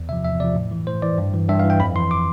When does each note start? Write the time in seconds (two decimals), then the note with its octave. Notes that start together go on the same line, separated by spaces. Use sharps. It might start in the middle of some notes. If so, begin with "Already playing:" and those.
Already playing: E2
0.09 C3 F3 E5
0.24 E2 E5
0.40 C3 F3 D5
0.55 A2
0.71 E3
0.87 A2 C5
1.02 E3 D5
1.18 G2
1.34 E3
1.49 G2 E5
1.59 F5
1.64 E3
1.70 G5
1.80 F2 B5
1.95 E3 C6
2.11 D6